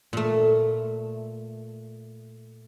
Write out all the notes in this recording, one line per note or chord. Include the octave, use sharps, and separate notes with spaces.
A#2 A3